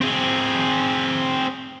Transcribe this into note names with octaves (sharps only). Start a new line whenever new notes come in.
C4 G#4